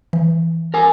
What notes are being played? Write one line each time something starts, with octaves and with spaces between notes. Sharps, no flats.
E3
A#4 G#5